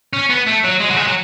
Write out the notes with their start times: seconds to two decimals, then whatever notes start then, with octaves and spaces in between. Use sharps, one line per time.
0.13 C#4
0.30 B3
0.47 A3
0.64 F#3
0.81 G#3
0.91 F#3
0.97 G#3
1.07 F#3